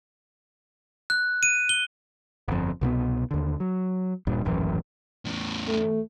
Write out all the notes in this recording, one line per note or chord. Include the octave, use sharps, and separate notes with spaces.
F#6
D#7
G7
G1 F2
C2 B2 A3 B3
D#2 D3
F#3
D#1 G2 A#2
D#1 A1 F#2 E3
E2 A2
A3